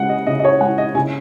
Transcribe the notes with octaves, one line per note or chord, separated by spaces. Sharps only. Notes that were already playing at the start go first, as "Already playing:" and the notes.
Already playing: C#3 G#3 F#5
D#5
C#3 D#5
D#5
C#5
G#3 F#5
D#5
C#3 G#5